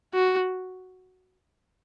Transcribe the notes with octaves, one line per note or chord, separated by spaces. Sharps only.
F#4